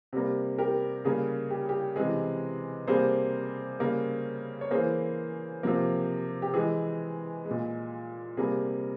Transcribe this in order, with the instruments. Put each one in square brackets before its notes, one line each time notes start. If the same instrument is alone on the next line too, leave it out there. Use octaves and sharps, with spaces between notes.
[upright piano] C3 G3 A#3
G4 A#4
C#3 G3 A#3 G#4
G4
G4
C3 E3 G#3 G#4
C3 G3 A#3 G#4 C5
C#3 G3 A#3
C#5
E3 A#3 G#4 C5
C3 F3 A#3
G4
E3 G#3 G#4
G#3
A#2
C3 G3 A#3 G#4